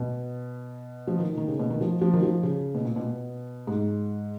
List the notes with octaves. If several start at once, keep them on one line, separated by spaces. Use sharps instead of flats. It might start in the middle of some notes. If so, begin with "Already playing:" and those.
Already playing: B2
F3
D#3
D#3
C#3
B2
D#3
F3
F3
D#3
F3
C#3
B2
A#2
B2
G#2